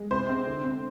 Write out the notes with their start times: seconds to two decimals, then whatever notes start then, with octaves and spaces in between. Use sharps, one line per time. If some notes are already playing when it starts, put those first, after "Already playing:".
Already playing: G#3
0.11 C3 C5
0.29 C4
0.47 D3
0.64 C4